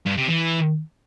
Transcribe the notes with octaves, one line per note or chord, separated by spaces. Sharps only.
G2
C3
E3